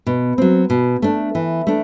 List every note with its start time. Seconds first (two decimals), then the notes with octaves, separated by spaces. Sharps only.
0.06 B2
0.38 F#3 C4
0.70 B2
1.02 A3 D4
1.35 E3
1.67 A3 D4